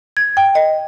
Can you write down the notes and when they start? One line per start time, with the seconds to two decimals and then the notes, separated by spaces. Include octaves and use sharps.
0.17 G#6
0.37 G5
0.55 D#5